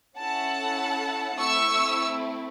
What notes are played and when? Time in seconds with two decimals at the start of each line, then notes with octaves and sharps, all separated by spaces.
0.17 C#4 E4 A4 F#5 A5
1.39 A3 C4 E4 C#6 E6